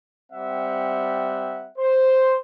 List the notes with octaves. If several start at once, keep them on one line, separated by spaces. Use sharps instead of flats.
G3 C4 E5 F#5
C5